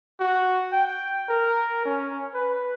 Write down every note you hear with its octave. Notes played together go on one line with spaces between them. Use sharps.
F#4
G5
A#4
C#4
B4